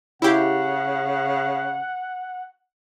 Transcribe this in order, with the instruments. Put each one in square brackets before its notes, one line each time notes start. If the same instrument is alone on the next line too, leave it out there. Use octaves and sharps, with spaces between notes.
[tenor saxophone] C#3 [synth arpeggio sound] E4 G4 [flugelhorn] F#5